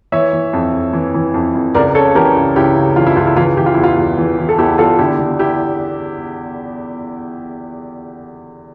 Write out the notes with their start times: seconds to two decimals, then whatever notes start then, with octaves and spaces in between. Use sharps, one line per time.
0.12 E3 C#5 E5
0.33 E3
0.53 F2
0.73 F2
0.93 E3
1.14 E3
1.34 F2
1.54 F2
1.75 C#2 A#4 D5
1.95 C#3 A4 C#5
2.15 E3 G4 A#4
2.36 C#2
2.56 C#2 E4 G4
2.76 C#3
2.96 E3 F4
3.07 E4
3.16 C#2 F4
3.27 E4
3.36 E3 F4
3.57 E3 G4
3.66 F4
3.74 E2 E4
3.83 F4
3.98 E2
4.18 E3
4.39 E3
4.49 A4
4.58 E2 E4 G4
4.78 E2 F4 A4
4.99 D3 E4 G4
5.19 D3
5.39 E4 G4